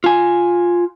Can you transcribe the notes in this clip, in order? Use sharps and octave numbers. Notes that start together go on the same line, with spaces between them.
F4 G#5